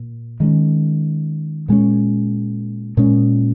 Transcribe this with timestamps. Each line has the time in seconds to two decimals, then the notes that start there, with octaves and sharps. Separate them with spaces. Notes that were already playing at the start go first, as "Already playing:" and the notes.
Already playing: A#2
0.40 D#3 G#3 C#4
1.68 A#2 G#3 C#4
2.97 A#2 G#3 C#4